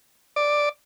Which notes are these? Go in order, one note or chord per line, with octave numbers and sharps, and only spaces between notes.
D5